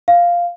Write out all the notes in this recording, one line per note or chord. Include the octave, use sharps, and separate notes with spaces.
F5